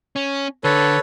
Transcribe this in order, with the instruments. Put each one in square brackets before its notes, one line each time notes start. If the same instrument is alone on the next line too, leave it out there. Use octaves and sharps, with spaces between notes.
[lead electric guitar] C#4
[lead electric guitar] D3 [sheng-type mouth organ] A4 B4 C#5